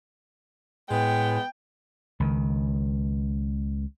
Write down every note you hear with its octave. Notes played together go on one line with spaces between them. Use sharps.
A2 G#3 B3 G5
C#2 D#3